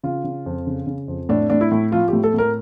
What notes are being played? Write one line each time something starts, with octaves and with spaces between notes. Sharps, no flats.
C#3 F4
C#3
F2
C#3
C#3
F2
A2 D4
A2 D4
E4
A2
F3 F4
A2 G4
A4
A2 A#4